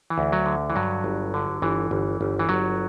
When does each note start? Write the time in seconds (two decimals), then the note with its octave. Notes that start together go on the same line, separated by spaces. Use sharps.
0.10 E3
0.18 D2
0.32 F#3
0.46 D3
0.70 E3
0.76 G2 F#3
1.04 G1
1.34 D3
1.62 G1 E3
1.91 G1
2.21 G1
2.39 E3
2.49 G1 F#3